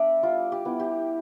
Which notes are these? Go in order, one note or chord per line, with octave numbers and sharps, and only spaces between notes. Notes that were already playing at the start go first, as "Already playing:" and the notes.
Already playing: B3 D4 D5 E5
G3 F4
G4
B3 E4
G4